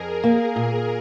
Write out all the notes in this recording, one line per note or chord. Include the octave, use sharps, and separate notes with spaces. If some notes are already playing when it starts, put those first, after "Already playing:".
Already playing: F2 G#4 A#4
A#3
A#2